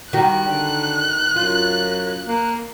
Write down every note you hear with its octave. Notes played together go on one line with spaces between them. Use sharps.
D#3 G3 F#4 F#6
D3
F#2 F4
A#3